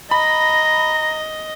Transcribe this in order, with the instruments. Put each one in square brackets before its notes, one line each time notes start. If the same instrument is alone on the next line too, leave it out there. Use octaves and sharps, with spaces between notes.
[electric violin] D#5 [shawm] A#5 [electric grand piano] B5